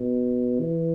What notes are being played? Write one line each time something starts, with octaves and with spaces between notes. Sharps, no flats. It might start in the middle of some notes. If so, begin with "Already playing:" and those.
Already playing: B2
E3